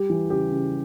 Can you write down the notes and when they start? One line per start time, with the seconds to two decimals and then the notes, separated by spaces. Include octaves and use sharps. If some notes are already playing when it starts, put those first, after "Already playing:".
Already playing: G3 G4
0.10 E3
0.30 C#3 G4
0.51 C#3